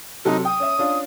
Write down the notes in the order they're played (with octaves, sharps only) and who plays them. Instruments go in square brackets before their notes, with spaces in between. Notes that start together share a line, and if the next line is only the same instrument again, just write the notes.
[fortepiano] C3 F#3 A4 [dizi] D#4
[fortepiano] G5 [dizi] D#6
[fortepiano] C#4 E5
C#4 D4 F4